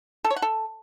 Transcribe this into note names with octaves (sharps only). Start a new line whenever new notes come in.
A4
C#5
F#5
A4